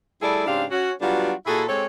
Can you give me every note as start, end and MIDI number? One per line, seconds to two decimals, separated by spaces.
0.22 0.46 55
0.22 0.46 57
0.22 0.46 64
0.22 0.46 68
0.22 0.46 69
0.22 0.46 74
0.47 0.64 44
0.47 0.64 49
0.47 0.64 60
0.47 0.64 62
0.47 0.64 67
0.47 0.64 77
0.71 0.91 61
0.71 0.91 66
1.02 1.32 54
1.02 1.32 55
1.02 1.32 59
1.02 1.32 62
1.02 1.32 65
1.02 1.32 66
1.46 1.64 46
1.46 1.64 64
1.46 1.64 66
1.46 1.64 68
1.46 1.64 69
1.68 1.86 56
1.68 1.86 60
1.68 1.86 67
1.68 1.86 69
1.68 1.86 73